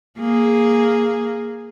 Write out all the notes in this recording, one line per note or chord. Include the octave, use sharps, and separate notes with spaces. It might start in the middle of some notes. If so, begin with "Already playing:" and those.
A#3 G#4